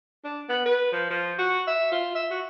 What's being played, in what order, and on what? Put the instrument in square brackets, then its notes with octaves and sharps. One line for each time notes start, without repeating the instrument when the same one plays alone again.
[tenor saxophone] D4
B3
B4
F3
F3
F#4
E5
F4
E5
F#4